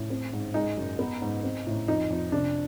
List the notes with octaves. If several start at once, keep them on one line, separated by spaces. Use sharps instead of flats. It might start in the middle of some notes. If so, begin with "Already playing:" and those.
Already playing: A2
C4
G#2
G#3 D#4
F#2
B3
G#2
C4
A2
F2 D#4
F2
C3 D4